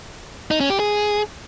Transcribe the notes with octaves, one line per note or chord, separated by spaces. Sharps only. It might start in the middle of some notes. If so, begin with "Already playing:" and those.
D#4
C#4
G4
G#4